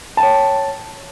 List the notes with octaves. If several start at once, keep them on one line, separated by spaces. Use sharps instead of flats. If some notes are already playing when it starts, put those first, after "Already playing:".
C#5 G5 A5